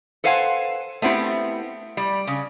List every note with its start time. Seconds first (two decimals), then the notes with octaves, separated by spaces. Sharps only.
0.24 A4 B4 C5 F5 F#5 G#5
1.02 A3 B3 C4 E4 G4
1.97 G3
2.27 C#3